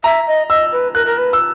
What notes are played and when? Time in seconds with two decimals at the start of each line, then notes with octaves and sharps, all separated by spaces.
0.04 E5 A#5
0.27 D#5
0.50 D#5 E6
0.72 B4
0.94 A#4 F#6
1.06 A#4
1.18 B4
1.33 E6